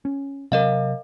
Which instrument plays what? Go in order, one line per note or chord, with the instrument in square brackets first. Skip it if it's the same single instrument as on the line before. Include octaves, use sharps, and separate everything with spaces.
[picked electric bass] C#4
[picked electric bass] C3 F#3 C4 [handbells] A#4 D#5 F5